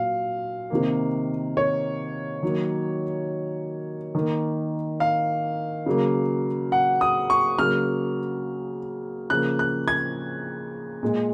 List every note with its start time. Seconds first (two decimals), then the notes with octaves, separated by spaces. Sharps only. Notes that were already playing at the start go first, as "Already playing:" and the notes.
Already playing: A#2 F#3 F5
0.70 C3 D#3 A#3
1.57 C#5
2.43 D#3 F#3 A#3
4.15 D#3 A#3
5.00 F5
5.86 C#3 F#3 A#3
6.72 F#5
7.01 D#6
7.30 C#6
7.59 C#3 F#3 A#3 F6
9.30 C#3 F3 A#3 F#6
9.59 F#6
9.88 G#6
11.03 A#2 G#3